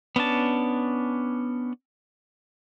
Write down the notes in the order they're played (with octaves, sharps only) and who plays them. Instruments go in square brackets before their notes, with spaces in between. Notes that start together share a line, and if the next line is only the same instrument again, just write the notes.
[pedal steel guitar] B3 C#4 D4 A5